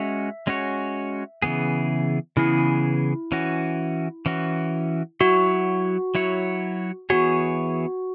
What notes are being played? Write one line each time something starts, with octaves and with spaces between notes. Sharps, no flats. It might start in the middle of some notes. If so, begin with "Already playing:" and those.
Already playing: G#3 C#4 F#4 C#5 E5
G#3 C#4 F#4 C#5
C#3 E3 B3 G#4
C#3 E3 B3 E4 G#4
E3 C#4 F#4
E3 C#4 F#4
F#3 E4 F#4 C#5
F#3 E4 C#5
E3 B3 F#4 G#4 C#5